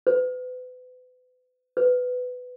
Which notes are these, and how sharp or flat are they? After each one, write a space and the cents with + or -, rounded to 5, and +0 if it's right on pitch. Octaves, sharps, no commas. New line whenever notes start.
B4 +35
B4 +15